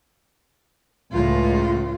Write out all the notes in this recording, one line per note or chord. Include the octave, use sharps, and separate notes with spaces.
C#2 A2 F4